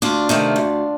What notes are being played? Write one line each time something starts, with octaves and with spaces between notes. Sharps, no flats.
D2 D4 F4
C3 D#3 A3
D2